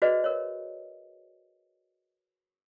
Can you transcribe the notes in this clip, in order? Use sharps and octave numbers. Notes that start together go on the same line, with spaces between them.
F#4 G#4 B4 C5 D5 D#5
A#4 C#5